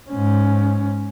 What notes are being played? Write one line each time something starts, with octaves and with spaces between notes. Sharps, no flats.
G#2 C#4